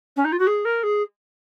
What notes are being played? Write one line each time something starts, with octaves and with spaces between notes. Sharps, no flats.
C#4
D#4
F4
F#4
G#4
A#4
G#4